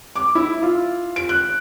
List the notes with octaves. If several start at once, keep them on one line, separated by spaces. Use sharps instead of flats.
D6
E4
F4
D7
F#6